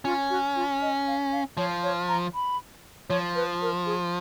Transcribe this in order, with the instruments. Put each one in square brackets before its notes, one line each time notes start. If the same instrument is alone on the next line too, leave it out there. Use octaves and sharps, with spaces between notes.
[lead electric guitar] C#4 [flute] F4
[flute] F#4
F4
D#5
F5
F5
[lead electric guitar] F3 [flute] C#5
[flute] C#5
A#5
B5
[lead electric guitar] F3 [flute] C#5
[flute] B4
A#4
G#4